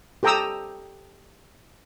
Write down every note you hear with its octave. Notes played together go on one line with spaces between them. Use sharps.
G4 A4 G5 A#5 D#6 E6